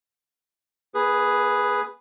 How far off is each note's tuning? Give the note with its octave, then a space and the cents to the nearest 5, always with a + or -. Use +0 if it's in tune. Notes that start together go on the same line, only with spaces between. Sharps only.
A#3 +40 G#4 +0 B4 +0